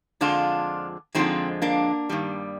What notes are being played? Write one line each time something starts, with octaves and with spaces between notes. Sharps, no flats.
F2 D3 F3 G#3 D4 F4
F2 D3 F3 G#3 C4 D#4
A#3 D4
G2 D#3 G3